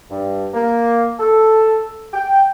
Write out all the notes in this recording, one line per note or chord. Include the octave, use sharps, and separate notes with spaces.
G2
A#3
A4
G5